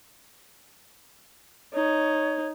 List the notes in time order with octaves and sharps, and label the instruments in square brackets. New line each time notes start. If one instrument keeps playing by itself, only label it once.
[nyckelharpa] D#4 [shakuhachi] C#5